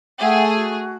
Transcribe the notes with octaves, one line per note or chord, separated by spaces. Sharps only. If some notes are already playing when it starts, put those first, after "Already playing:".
A3 G#4 E5 F#5 G5
F#4